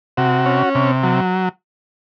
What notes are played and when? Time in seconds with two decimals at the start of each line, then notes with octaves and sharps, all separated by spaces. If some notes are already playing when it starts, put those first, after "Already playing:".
0.17 C3 F#4
0.46 C#4
0.75 C3
1.03 F#3